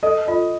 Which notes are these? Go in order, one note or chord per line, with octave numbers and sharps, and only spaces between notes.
A4 D#5
F4 D#5